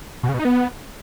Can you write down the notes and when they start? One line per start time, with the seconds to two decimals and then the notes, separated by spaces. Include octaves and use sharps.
0.23 B2
0.29 C#3
0.34 B2
0.39 D#4
0.45 B3